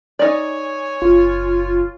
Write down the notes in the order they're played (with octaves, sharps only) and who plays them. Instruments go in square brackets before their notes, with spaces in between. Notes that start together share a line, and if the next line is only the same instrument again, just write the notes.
[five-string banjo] D#4 D5 [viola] C#5 G#5
[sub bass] F#1 [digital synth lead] F4